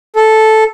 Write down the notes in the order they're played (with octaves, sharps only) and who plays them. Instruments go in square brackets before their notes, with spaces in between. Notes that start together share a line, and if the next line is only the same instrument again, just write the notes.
[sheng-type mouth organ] A4